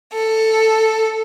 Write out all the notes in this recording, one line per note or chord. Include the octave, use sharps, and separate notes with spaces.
A4